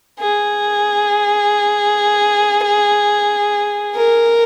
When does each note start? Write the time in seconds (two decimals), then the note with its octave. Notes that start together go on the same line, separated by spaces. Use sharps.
0.20 G#4
3.96 A#4